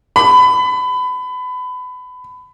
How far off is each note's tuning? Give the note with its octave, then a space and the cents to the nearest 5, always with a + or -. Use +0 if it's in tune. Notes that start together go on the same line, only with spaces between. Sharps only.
B5 +25